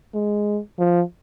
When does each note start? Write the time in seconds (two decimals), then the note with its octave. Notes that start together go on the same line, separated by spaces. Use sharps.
0.15 G#3
0.79 F3